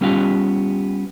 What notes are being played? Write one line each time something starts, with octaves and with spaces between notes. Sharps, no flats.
G3 B3 C#4 F4 G4 F5